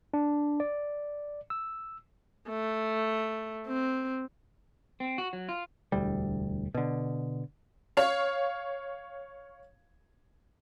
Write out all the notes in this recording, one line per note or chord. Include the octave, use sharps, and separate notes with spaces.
D4
D5
E6
A3
C4
C4
F#4
F#3
F4
E1 D2 G3
B2 D3
C#5 F5